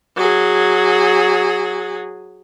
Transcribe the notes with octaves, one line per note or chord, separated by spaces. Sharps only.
F#3 G#4